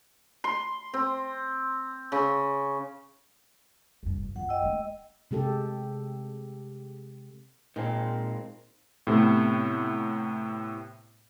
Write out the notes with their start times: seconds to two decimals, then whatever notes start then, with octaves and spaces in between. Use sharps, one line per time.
0.44 C6
0.94 C4
2.12 C#3
4.03 F1 G2
4.36 F#2 F4 F#5
4.49 D#5 G5 E6
4.62 G#3 A3
5.31 C3 G#3 G4 A4
7.76 A#2 D#3 G#3 C4
9.07 A2 C3 A3 B3